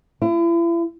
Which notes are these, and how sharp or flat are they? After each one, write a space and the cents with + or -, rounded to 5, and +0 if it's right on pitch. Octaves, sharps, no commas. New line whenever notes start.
E4 +40